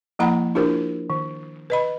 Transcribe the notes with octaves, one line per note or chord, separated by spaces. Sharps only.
F3 A#3 E4 F#5 A#5 B5
D4 E4 F4 G4 A#4 C5
D#3
B4 D#5 B5